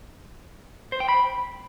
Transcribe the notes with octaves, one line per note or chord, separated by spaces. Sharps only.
C5
G5
B5